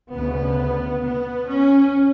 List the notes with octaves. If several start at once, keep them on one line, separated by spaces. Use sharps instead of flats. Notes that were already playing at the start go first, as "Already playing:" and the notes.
D2 C#3 B3
B3
C#4